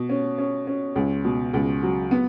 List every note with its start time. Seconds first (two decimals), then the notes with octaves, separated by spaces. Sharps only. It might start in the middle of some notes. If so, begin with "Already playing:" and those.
Already playing: B2
0.09 C#4
0.38 C#4
0.67 C#4
0.96 C#2
1.24 B2
1.54 C#2
1.83 F#3
2.11 B3